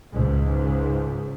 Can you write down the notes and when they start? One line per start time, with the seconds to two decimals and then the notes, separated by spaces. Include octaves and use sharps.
0.14 C#2 G#2